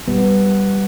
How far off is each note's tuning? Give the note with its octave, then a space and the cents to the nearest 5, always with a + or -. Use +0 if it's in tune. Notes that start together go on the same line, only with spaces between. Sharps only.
G3 -5 B3 +0